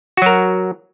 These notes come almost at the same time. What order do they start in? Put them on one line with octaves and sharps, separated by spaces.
F#4 F#3 A#4